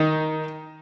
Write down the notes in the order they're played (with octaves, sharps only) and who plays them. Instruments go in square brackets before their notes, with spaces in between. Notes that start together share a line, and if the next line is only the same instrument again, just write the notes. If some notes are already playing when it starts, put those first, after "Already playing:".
Already playing: [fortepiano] D#3 D#4